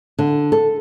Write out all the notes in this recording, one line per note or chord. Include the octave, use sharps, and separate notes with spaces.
D3
A4